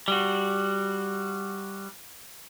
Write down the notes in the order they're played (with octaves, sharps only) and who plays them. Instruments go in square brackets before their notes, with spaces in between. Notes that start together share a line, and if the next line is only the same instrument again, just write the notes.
[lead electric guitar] G3 F#4